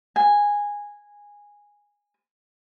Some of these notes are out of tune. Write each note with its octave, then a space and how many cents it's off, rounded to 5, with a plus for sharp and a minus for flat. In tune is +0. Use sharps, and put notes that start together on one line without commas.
G#5 -10